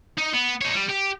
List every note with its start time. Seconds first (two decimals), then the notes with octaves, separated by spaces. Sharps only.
0.18 D#4
0.33 B3
0.62 D#4 C#5
0.75 G3
0.90 G4